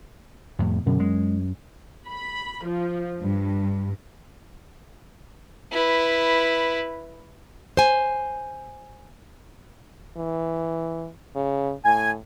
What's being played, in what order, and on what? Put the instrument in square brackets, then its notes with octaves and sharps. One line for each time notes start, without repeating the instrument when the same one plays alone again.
[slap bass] F2 A2
[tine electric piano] F#2 [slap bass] B2 D3
[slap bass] G#3
[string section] B5
F3
G2
[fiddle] E4 B4
[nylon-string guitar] C5 G#5
[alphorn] E3
C#3
[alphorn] A2 [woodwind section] G#5